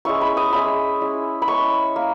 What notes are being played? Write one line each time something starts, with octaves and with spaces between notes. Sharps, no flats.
G#3 C#4 E4 C#6
B5
D#6
G#3 C#4 E4 B5
G#3 C#4 E4
B5
G#3 C#4 E4 C#6
A#3